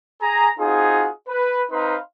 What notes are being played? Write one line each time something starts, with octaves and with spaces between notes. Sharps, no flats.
G#4 A#5
C4 D#4 F4 F#4 G#4
B4
C4 D#4 B4 F5 A#5 C6